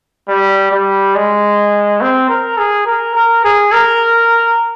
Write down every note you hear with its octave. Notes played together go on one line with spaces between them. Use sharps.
G3
G3
G#3
C4
A#4
G#4
A#4
A#4
G#4
A#4